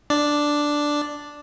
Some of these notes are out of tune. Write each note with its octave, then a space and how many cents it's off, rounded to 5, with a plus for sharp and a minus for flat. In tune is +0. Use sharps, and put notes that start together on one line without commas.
D4 +0 D5 +0